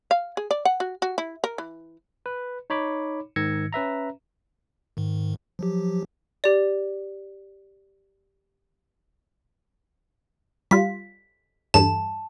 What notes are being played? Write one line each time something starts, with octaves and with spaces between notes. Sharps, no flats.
F5
G#4
D5
F#5
F#4
F#4
E4
A#4
E3
B4
D#4 C#5 B5 D6
G#2 D#3 E6 G#6 A#6 C#7
C#4 B4 E5 A#5
G#2 D#3
F3 F#3 G4
G4 D5
G3 F4 B6
E2 G2 A4 A5